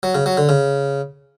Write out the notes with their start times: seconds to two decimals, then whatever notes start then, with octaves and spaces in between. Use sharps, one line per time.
0.03 F#3
0.15 C#3
0.26 F#3
0.37 D3
0.49 C#3